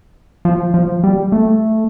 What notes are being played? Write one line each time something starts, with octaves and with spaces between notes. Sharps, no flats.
F3
F3
G3
A3